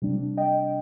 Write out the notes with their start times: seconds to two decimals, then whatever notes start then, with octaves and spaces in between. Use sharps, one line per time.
0.02 C3 G3 D4
0.37 D#5 G5